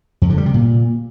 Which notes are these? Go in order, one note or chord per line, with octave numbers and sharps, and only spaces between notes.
F2
D3
G3
C3
A#2